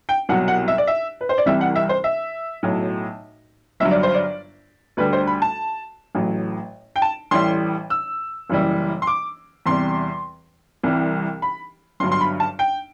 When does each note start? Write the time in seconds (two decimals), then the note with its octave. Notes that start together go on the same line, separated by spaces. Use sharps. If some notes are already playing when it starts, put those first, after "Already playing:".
0.09 G5
0.29 C2 B2 F#3 F#5
0.48 F#5
0.68 E5
0.78 D5
0.87 E5
1.21 B4
1.29 C5
1.38 D5
1.46 C2 C3 E3 G3 E5
1.61 F#5
1.76 E5
1.89 C5
2.04 E5
2.63 B1 A2 F#3
3.80 G1 G2 F#3 E5
3.91 D5
4.03 C5
4.14 D5
4.97 D2 D3 G3 B4
5.13 C5
5.27 B5
5.42 A5
6.15 A1 A2 F#3
6.96 G5
7.02 A5
7.31 A1 A2 E3 G3 C6
7.90 E6
8.50 F#1 F#2 E3 G3
9.02 C6
9.07 D6
9.66 E2 C3 G3 C6
10.84 C2 C3 E3 G3
11.42 B5
12.00 G1 C6
12.03 G2 F#3
12.12 C6
12.21 B5
12.40 A5
12.59 G5